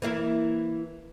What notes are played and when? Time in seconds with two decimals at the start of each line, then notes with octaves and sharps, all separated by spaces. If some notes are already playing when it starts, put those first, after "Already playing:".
0.02 E3 A#3 E4